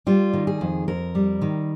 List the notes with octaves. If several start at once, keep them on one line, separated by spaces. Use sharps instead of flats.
G3 F4
D#3
G#4
F2
F2 A#4
G3
D#3